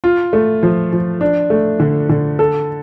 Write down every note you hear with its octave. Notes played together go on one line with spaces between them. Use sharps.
F4
A3
F3
F3
D4
A3
D3
D3
A4